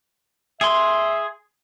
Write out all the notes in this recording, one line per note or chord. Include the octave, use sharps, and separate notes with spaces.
G#4 E5 C6